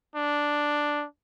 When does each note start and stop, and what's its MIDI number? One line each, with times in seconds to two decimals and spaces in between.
0.15 1.05 62